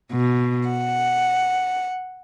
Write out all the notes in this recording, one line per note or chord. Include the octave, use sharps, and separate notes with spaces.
B2
F#5